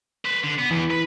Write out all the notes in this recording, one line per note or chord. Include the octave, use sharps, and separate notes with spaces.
B4 C5
D3
B3
E2 E3
B4